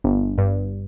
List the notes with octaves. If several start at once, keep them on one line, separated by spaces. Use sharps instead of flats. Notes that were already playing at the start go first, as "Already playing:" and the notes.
G1
G2